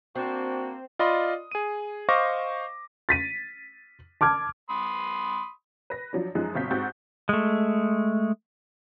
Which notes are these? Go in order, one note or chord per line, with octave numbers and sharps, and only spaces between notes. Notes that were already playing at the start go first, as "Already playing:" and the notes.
A#3 C4 D4 F#4
F4 D5 D#5 B5 C6 D#6
G#4 D#7
C5 D#5 F5 C#6 D6 A#6
A6 B6 D#7
A5 D6 F6 G#6
B5 C6 D#6
B4 A#6
F3 F#3 D4
F#2 F3 G#3 D#4 F#6
G1 B2 C4 F5 G6 B6
G#2 C4 F#4 C#6 G6 A6
G#3 A3